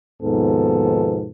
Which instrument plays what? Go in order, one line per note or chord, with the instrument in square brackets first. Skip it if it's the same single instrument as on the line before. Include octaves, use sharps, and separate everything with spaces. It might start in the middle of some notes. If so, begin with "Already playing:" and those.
[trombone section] D#2 G#2 B2 F3 B3 A4